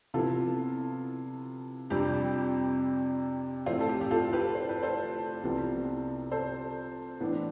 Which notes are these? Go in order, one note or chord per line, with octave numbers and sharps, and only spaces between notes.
C3 F3 B3 E4 F4 A4
F2 C3 G3 D4 G4
A2 F3 C4 F4
A4
G4
G4
F4 A4
G4 B4
C5
B4
A4 C5
C2 C3 F3 B3
A4 C5
A2 E3 B3 D4